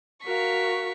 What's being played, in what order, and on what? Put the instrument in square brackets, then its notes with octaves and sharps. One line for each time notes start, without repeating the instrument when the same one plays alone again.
[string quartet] F#4 A#4 F5 [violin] C#6 B6